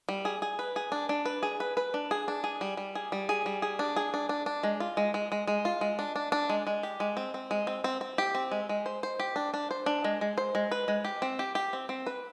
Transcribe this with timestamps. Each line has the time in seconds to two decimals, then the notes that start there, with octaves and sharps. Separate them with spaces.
0.09 G3
0.25 G#4
0.42 G#4
0.59 B4
0.76 G#4
0.92 D4
1.09 D4
1.25 B4
1.43 G#4
1.60 B4
1.77 B4
1.94 D4
2.11 G#4
2.28 D4
2.44 G#4
2.61 G3
2.77 G3
2.95 G#4
3.12 G3
3.29 G#4
3.46 G3
3.62 G#4
3.79 D4
3.96 G#4
4.14 D4
4.29 D4
4.46 D4
4.63 G#3
4.80 F4
4.97 G#3
5.14 G#3
5.32 G#3
5.47 G#3
5.65 F4
5.81 G#3
5.99 D4
6.16 D4
6.32 D4
6.50 G#3
6.67 G#3
6.83 G4
7.00 G#3
7.17 C4
7.34 C4
7.51 G#3
7.67 C4
7.84 C4
8.01 C4
8.18 G4
8.35 C4
8.51 G#3
8.69 G#3
8.86 C5
9.03 C5
9.20 G4
9.36 D4
9.54 D4
9.71 C5
9.86 D4
10.04 G#3
10.21 G#3
10.38 C5
10.55 G#3
10.71 B4
10.88 G#3
11.05 G4
11.22 C4
11.39 G4
11.55 G4
11.73 C4
11.89 C4
12.07 B4